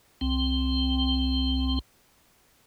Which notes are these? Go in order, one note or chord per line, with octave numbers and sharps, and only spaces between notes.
C2 C4